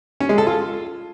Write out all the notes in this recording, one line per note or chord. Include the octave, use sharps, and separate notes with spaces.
C#4
G#3
A4
F4